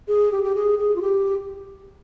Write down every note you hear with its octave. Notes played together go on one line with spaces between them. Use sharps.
G#4
G4
G4
G#4
G#4
F4
G4